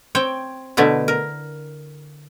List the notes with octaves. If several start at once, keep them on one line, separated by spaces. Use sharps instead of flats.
C4 C#5 G5
B2 D3 A3 B3 E4
A#4